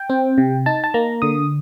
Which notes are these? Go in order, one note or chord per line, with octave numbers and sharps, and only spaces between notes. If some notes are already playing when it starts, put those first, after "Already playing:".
Already playing: G5
C4
C3
D#4 A5
A5
A#3 A#5
D3 D#6